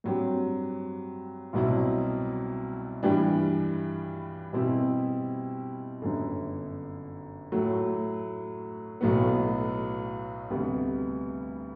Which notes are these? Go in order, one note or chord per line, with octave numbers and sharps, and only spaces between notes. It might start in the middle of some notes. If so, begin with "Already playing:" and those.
G2 F#3 C4 G4
C2 B2 F#3 C4 E4
G2 E3 G3 D4 G4
B2 G3 C4 E4 G4
G1 F#2 D3
A2 F#3 A3
B1 A2 F#3 B3
D2 C3 G3 B3